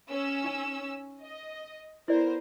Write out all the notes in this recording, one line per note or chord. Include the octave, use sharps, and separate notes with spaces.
C#4 E6
D#4 G#5
D#5
B3 E4 A#4 C5 D5